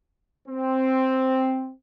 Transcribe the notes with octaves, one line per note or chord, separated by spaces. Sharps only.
C4